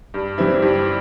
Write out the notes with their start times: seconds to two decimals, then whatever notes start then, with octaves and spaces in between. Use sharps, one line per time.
0.14 G2
0.38 E3 G3 C4 E4
0.62 G2